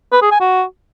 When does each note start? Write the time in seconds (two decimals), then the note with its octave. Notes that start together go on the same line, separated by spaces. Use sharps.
0.12 B4
0.22 G#4
0.31 G#5
0.41 F#4